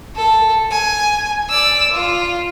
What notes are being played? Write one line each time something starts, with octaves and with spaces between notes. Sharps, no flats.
A4
G#5
D5 E6
F4